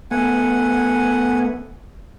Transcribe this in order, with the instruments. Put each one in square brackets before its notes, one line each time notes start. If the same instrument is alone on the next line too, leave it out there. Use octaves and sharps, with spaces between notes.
[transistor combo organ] A3 B3 [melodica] F#5 G#5